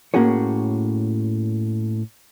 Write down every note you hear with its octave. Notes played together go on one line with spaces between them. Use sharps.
A2 A#3 C#4 F#4 G#4 C#5